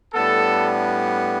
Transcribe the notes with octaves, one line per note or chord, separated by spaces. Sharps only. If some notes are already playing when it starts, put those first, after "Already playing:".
A2 G3 B3 D4 A4